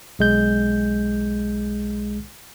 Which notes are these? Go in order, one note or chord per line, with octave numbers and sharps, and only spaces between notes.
B1 G#3 G6